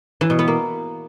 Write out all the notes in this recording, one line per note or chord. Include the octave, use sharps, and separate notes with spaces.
E3
B2
B3
A#3